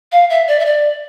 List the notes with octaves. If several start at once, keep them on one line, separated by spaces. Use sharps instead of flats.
F5
E5
D5
E5
D5